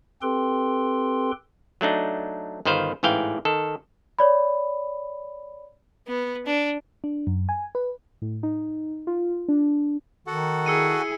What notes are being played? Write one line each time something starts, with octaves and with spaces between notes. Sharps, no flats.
C4 G4 A4 B4 G5 C6
F#3 A3 D4 D#4
G1 D#3 B4 C5 F5
A1 G#2 E3 F5 G5
D#3 A4
C#5 D5 B5
B3
D4
D4
F#2
G#5
B4
A2
D#4
F4
D4
D#3 F#4 A4 F#5
E4 G#4 E6 C#7 D#7